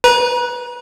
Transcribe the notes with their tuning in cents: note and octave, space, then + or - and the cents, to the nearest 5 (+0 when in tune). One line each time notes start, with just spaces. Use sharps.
B4 +0 A#5 +40